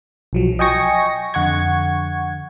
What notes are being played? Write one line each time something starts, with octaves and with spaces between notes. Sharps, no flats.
B1 F3 F#3
D#5 G5 G#5 C#6 A#6
F2 D3 F#5 C#6 G#6